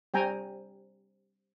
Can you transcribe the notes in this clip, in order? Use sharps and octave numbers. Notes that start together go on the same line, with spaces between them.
G3 C4 G5 G#5 A#5